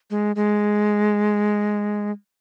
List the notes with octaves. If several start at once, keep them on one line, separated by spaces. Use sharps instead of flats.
G#3
G#3